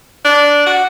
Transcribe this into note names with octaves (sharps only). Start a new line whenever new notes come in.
D4
F#4